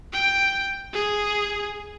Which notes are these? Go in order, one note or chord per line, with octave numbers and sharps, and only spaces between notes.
G5
G#4